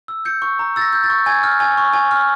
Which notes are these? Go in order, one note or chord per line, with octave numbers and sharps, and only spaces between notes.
E6
G6 C#7
C#6
A#5
E6 A6
A#6
G6
A6
C#6
G#5 G#6
F6
G#5
C#6
G#5
F6